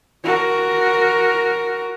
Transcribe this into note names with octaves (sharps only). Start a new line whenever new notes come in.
F#4 A#4